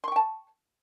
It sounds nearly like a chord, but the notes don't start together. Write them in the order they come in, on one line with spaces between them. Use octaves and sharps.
C6 C#6 G5 A5